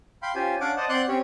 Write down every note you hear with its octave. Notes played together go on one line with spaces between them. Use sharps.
F5 G5 B5 C6
C#4 F4 G4 C5 G#5
C#4 D4 F5 F#5 D6
C5 D5 D#5 F#5 A5
C4 D5 F#5 C6 F#6 G6
C4 C#4 G4 C#5